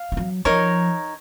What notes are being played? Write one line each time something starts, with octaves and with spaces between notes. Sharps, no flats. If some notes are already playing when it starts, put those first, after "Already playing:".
Already playing: F5
F3
F#3
F3 D#4 A#4 C#5